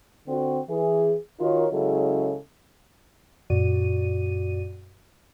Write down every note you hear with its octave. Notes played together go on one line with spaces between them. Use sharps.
D3 C4 F#4
E3 G#4
D#3 D#4 F4 F#4 A#4 C#5
C#3 F#3 G#3 C#4 E4 A4
F#2 A#2 F#4 D5 D#7